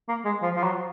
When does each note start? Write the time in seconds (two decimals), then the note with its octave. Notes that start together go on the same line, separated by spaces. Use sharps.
0.09 A#3
0.25 G#3
0.42 F3
0.56 F3
0.64 F#3